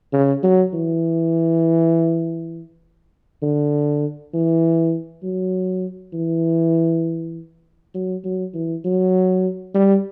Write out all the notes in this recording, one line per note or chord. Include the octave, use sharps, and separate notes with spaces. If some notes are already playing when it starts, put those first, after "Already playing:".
C#3
F#3
E3
D3
E3
F#3
E3
F#3
F#3
E3
F#3
G3